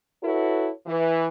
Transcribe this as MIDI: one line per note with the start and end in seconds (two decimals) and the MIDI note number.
0.22 0.69 64
0.22 0.69 66
0.22 0.69 69
0.22 0.69 71
0.22 0.69 73
0.87 1.27 52